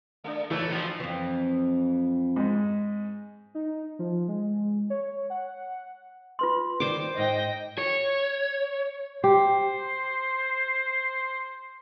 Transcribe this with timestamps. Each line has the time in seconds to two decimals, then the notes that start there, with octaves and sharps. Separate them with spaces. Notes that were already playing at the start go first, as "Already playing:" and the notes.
0.24 G#3 A#3 D4
0.51 A#2 E3 A3 C#5
0.72 G2 F3 F#4 E5
1.00 F2 E3
2.36 G#2 G#3
3.55 D#4
3.99 F3
4.29 G#3
4.90 C#5
5.30 F#5
6.39 F4 B4 C6
6.80 D#3 G3 C5 D6
7.17 G#2 D#5 G5 A#6
7.78 C#5
9.24 G4 C5